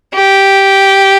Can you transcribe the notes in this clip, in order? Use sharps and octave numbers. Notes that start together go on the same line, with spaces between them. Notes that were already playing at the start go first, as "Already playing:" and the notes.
G4